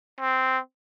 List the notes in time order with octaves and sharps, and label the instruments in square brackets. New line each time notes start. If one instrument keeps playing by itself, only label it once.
[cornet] C4